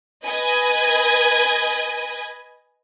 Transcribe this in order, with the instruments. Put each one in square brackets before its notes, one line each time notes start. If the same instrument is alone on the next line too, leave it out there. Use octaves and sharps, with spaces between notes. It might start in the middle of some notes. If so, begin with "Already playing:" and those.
[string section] B4 D#5 G#5